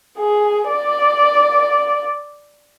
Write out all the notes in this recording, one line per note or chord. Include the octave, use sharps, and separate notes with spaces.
G#4
D5